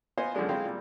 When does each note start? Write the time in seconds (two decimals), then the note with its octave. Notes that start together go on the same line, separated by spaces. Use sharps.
0.17 B3 F4 C5 D#5 G#5
0.35 F#2 D3 F3 G#3 D4
0.49 G#3 C4 E4 F5 G5
0.65 A#2 G3